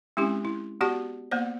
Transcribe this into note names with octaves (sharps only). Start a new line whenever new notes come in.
G#3 C4 C#4 E4 G4
E4
B3 F#4 G4 D5 A5
A#3 B3 C5 D5